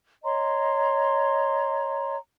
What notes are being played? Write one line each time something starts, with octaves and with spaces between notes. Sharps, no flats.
C#5 D#5 A#5 C6